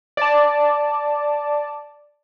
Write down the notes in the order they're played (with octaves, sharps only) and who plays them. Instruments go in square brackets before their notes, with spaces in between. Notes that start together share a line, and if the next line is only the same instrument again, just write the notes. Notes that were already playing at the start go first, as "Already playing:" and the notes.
[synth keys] D5 A5